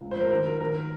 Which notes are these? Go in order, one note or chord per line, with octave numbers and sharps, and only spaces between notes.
C#2
C5
F3 A#4
D#3 A#4
F#3 A#4
D#3 A#4